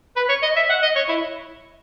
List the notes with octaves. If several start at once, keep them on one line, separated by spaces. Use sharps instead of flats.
B4
C#5
D#5
E5
F#5
D#5
C#5
E4